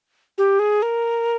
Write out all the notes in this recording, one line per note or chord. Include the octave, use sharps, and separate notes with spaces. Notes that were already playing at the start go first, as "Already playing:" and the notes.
G4
G#4
A#4